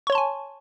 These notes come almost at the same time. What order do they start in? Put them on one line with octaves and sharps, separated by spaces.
C#6 C#5 C6 A5 G#5